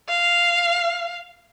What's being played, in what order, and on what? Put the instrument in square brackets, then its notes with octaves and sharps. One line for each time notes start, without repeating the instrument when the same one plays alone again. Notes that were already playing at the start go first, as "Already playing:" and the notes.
[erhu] F5